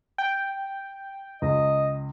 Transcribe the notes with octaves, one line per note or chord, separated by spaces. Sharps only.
G5
C#2 D#5